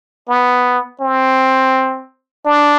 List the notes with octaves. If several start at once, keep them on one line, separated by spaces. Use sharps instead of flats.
B3
C4
D4